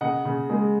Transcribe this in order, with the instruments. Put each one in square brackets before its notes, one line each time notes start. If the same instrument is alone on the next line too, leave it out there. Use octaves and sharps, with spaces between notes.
[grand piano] C#3 D#5 F#5
C#3
G#3